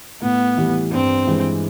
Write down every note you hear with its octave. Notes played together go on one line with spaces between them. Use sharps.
A2 B3
E3 G3
G2 C4
E3 G#3